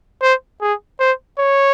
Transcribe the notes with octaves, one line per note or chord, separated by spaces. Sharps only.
C5
G#4
C5
C#5